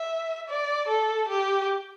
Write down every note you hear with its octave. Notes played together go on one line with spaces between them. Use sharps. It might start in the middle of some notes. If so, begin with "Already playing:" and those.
Already playing: E5
D5
A4
G4